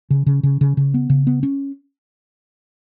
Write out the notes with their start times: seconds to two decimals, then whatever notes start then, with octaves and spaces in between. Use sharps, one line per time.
0.10 C#3
0.26 C#3
0.43 C#3
0.61 C#3
0.77 C#3
0.94 B3
1.10 C#3
1.27 B3
1.43 C#4